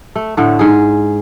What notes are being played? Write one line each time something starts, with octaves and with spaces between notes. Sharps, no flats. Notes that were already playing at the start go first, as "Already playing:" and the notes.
A3
A2 D3 A3
G#2 G#4